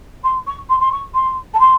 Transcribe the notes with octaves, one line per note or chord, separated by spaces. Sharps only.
C6
C#6
C6
C6
C#6
C6
A5
C6